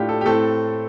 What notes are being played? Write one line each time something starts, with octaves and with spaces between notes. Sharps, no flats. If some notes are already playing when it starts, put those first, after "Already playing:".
Already playing: A2 A3 D4 F4 G4
A4
G4
A2 A3 C4 A4